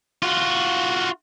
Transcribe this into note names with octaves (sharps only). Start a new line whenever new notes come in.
F4 F#4